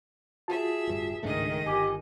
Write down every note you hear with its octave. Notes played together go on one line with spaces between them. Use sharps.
F4 F#4 G#4 E5 A5
D1 G2
C#2 G#2 D#3 G#3 A3 D4 D#5
G1 G4 G#5